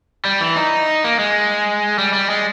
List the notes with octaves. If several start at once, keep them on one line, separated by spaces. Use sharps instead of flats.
G3
E3
D#4
A#3
G#3
G3
G3
G#3